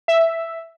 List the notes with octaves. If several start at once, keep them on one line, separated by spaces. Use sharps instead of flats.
E5